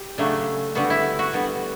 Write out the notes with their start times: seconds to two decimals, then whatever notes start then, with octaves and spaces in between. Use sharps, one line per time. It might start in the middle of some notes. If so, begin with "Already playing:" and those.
Already playing: G4
0.18 C#3 F#3 A3 D4
0.75 D3 G3 B3 F#4
0.90 E4
1.19 F#4
1.33 D3 G3 B3